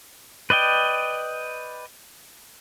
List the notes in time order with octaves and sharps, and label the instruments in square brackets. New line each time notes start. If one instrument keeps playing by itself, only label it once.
[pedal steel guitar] B4 D5 D#5 G5